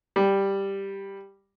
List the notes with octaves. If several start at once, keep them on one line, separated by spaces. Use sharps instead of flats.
G3